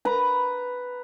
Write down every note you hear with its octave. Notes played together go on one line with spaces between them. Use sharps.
B4 A#5